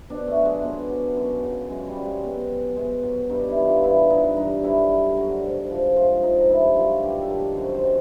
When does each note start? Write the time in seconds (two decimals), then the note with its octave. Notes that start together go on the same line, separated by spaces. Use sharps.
0.10 B2 D4
0.28 A3
0.36 F#3
0.45 G#3
0.63 B2
0.90 F#3
1.16 F#2
1.43 C#3 F#3
1.70 F#2 G#3
1.88 G3
1.96 C#3 F#3
2.05 G#3
2.24 B2
2.49 F#3
2.76 B2 G#3
3.03 F#3
3.29 G2 D#4
3.48 E4
3.57 E3
3.66 F4
3.83 G2 E4
4.10 E3 D#4
4.37 G2 D#4
4.63 D3 F#3 E4
4.90 G2
5.17 D3 F#3
5.43 G#2
5.70 F3
5.96 G#2 F4
6.23 F3 D#4
6.49 G2 E4
6.76 D#3 F#3 F4
7.03 G2 G4
7.21 A4
7.30 D#3 F#3
7.57 F#2 C5
7.74 C5
7.83 D#3 F#3